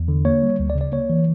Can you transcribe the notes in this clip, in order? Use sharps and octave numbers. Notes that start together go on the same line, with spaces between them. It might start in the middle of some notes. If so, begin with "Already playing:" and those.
Already playing: E2
D3
A#3 C#5
G3
D2
D5
C#3
D5
A#3 C#5
E3